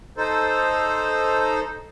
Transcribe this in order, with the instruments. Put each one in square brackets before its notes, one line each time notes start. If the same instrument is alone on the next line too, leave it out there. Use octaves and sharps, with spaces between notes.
[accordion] D#4 A4 C5